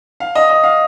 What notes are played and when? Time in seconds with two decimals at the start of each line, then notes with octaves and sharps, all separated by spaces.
0.20 F5
0.35 D#5
0.50 D#5
0.64 F5